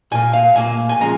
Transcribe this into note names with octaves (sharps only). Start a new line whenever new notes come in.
A#2 A#3 G#5
F5
A#2 A#3 G#5
G#5
C#3 F3 G#3 A#5